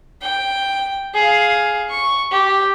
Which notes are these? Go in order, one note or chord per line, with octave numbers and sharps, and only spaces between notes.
G5
G#4 F5
C#6
G4